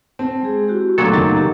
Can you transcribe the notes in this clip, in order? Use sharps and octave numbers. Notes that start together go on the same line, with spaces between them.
C4 A5
G#3 G#4
E4 F#4 G4
A#2 F#3 A3 B3 D4 A4
F#1 D#3 A6
G4